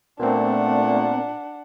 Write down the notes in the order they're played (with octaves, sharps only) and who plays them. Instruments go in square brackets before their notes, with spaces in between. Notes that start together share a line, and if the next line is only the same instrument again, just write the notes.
[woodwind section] A#2 [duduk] A3 [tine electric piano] B3 C4 [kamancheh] D4 F#5